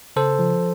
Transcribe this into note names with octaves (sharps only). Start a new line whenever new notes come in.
C#3 A4 C5
F3